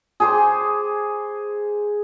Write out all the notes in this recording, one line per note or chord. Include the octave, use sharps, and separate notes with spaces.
G#4 C5 D6